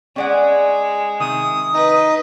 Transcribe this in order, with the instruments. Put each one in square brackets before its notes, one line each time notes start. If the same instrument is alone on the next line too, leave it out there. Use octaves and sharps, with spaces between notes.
[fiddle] G#3 [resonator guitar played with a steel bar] C#4 D5 F#5
[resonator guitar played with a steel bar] C3 D#3 [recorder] D#6
[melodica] D#4 D#5 [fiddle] B4